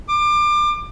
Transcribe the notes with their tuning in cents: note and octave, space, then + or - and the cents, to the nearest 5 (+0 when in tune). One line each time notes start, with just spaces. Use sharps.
D6 +30